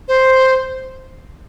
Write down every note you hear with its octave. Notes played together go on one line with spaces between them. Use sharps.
C5